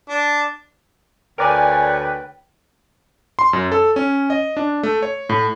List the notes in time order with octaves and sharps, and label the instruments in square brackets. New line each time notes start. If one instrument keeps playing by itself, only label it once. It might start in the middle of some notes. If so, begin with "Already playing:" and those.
[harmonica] D4
[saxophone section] D2 B4 C#5 [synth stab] A#4 D5 G#5 [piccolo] G5
[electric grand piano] C6
F#2
A4
C#4
D#5
D4
A3
C#5
A2